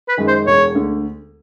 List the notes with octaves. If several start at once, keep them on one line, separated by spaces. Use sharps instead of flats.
B4
F#2 D#3 G#3
C5
E1 C#5
D2 D3